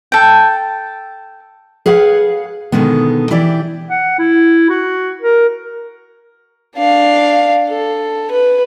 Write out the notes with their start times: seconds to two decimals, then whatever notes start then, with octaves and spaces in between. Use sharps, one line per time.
0.12 A4 G5
1.86 G#4 B4 C#5 F5 F#5
2.72 B2 D3 D#3 G#3 B3
3.31 E3 E4 G4 D5
3.89 F#5
4.18 E4
4.69 F#4
5.21 A#4
6.76 D4 F5
7.68 A4
8.31 B4